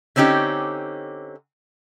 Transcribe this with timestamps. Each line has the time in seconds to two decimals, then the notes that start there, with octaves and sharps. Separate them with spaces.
0.16 D3 C4 C#4 D#4 G4